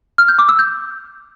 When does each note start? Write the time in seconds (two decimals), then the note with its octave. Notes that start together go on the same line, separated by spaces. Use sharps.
0.18 F6
0.28 G6
0.39 D6
0.49 E6
0.59 G6